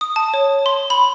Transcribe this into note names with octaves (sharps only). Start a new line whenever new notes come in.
D#6
A5
C#5
C6
B5